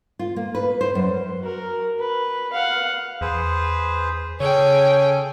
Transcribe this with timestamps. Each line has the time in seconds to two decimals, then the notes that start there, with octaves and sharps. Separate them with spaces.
0.19 F4
0.36 A#3
0.55 B4
0.81 C5
0.95 F#2
1.40 F#4 A#4
1.99 B4
2.53 F5 F#5
3.21 E2 G#4 B4 C5
4.40 C#3 C#4 G#4 A4 C#5 G5 G#5